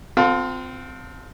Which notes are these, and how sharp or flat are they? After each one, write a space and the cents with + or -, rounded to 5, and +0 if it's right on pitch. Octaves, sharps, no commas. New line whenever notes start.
C4 -20 F4 +25 A4 +10